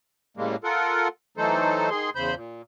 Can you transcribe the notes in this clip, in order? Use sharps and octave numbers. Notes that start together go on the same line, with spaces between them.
A2 C#3 G3 G#3 A#3
F4 A4 A#4 F#5
E3 F#3 A3 D#4 A4 C5
D#3 G#4 C6
E2 C#3 C5 B5 G6
A#2